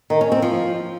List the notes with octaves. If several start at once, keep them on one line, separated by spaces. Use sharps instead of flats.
D#3
C#4
C4
F3